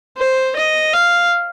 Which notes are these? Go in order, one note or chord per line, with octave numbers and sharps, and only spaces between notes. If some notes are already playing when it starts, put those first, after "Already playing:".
C5
D#5
F5